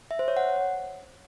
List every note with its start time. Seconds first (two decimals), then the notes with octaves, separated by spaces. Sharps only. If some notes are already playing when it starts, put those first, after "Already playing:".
0.11 E5
0.19 C5
0.28 C#5
0.37 F#5